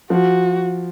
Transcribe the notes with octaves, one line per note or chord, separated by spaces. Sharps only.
F3 F#4